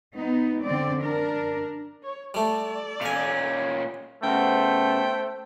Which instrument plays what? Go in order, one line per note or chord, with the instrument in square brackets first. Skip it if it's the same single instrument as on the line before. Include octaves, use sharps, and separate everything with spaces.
[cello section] B3 D#4
D3 C4 D5
D4 A#4
[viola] C#5
[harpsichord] G3 A3 [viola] A4 D5
[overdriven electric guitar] A#2 C#4 [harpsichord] F5 G#5
[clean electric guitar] C#3 B3 [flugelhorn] A3 [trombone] C5 [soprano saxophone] G5